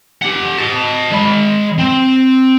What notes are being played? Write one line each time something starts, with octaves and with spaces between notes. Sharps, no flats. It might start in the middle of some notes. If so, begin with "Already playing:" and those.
G4 F#5
D#5 A5
G#3 B5
C4